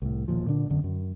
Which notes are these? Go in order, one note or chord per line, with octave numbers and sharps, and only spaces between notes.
C2 A2
E1 D#2 A#2 F3
A#2 D3 D4
E1 B1 F#2 D3
F#2